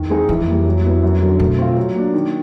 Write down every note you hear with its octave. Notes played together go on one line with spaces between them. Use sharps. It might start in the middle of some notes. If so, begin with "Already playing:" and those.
Already playing: E2 D#3
G#3 C4 D#4 G#4
F2 E3
G3 A#3
F#3
B3 E4
F#2
D3 F#3
B2 A3
C4 F4
F#3
A#3 D4
D#3